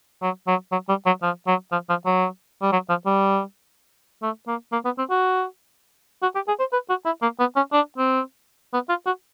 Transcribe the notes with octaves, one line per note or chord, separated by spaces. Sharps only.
F#3
F#3
F#3
G3
F#3
F3
F#3
F3
F3
F#3
G3
F#3
F3
G3
A3
A#3
A#3
B3
C4
F#4
F#4
G4
G#4
C5
B4
F#4
E4
A#3
B3
C#4
D4
C4
B3
F4
F#4